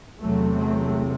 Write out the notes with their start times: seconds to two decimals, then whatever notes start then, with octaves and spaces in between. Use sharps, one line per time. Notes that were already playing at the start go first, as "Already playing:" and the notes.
0.19 E2 C3 F#3 A3
0.56 F#3 A3